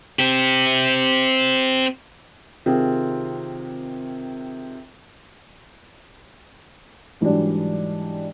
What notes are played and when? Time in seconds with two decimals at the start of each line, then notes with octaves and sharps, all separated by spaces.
0.19 C4 G4
2.66 C3 D#3 C4 F4 G#4
7.21 G#2 E3 F#3 G3 D4